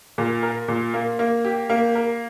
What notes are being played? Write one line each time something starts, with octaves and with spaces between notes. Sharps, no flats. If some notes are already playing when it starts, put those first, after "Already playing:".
A#2
A#4
A#2
A#3
A#3
G4
A#3
A#4